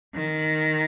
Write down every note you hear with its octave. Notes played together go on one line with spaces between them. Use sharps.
D#3